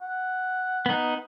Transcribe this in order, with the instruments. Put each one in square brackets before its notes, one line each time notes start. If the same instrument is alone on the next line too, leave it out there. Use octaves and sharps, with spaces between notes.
[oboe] F#5
[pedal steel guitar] B3 D#4